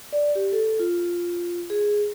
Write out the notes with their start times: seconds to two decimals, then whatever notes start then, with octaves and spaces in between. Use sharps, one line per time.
0.13 D5
0.35 G4
0.52 A4
0.79 F4
1.70 G#4